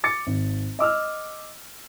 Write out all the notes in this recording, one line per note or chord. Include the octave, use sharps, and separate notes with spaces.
D6 A6 C#7
G#1
D#5 D6 E6 F6